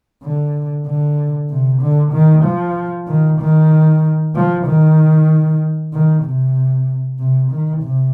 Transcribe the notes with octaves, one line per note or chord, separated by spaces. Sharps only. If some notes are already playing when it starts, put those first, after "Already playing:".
D3
D3
C3
D3
D#3
F3
D#3
D#3
F3
D#3
D#3
C3
C3
D#3
C3